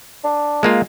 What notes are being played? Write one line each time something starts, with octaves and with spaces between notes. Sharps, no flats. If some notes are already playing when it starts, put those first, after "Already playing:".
D4
G#3 A#3 F4